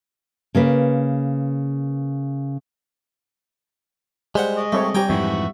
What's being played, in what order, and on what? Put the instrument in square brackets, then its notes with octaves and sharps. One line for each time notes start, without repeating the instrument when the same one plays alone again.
[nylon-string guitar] C#3 A#3 B4
[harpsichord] G3 C5 F#5 [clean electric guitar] G#3
[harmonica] D#5 C#6
[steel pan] G3 C4 C#5 [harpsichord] A3
[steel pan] G3 G4 C#5 [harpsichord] G5 G#5 A#5
[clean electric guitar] F2 G#2 E3 [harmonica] E5 F#5 C#6